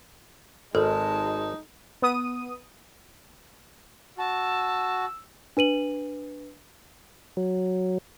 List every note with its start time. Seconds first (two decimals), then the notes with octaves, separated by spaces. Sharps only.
0.75 G#1 G#3 D#4 A4 A5
2.02 B3 D#6 D#7
4.18 F#4 A5 E6
5.57 D4 B4 D#7 F#7
7.37 F#3